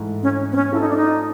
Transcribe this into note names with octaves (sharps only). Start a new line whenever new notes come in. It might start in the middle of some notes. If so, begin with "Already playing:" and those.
Already playing: G#2 E3 A3
C#4
C4
C#4
A3 C4 E4 F4 A4 C5
D#4
D4
D#4